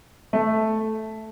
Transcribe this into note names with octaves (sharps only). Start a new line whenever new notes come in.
A3